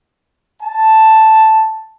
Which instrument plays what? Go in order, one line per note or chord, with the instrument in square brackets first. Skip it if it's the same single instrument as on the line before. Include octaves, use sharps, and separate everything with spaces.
[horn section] A5